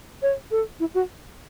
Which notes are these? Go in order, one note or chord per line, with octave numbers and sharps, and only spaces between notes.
C#5
A4
E4
F#4